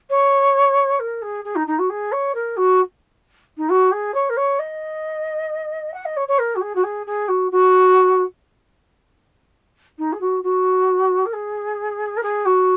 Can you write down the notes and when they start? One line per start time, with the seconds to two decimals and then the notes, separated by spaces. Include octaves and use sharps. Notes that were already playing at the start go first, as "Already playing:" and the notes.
0.09 C#5
0.99 A#4
1.22 G#4
1.44 G#4
1.55 D#4
1.67 D#4
1.78 F#4
1.89 G#4
2.12 C#5
2.34 A#4
2.56 F#4
3.57 D#4
3.69 F#4
3.91 G#4
4.14 C#5
4.29 A#4
4.36 C#5
4.59 D#5
5.93 F#5
6.05 D#5
6.16 C#5
6.28 C#5
6.38 A#4
6.55 F#4
6.61 G#4
6.75 F#4
6.83 G#4
7.06 G#4
7.28 F#4
7.51 F#4
9.98 D#4
10.12 G#4
10.20 F#4
10.43 F#4
11.25 A#4
11.33 G#4
12.17 A#4
12.23 G#4
12.45 F#4